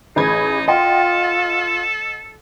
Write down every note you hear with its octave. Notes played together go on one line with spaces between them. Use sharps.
A1 D#4 G#4 B5 G#6
F4 A4 D#5 F#5 G5 C6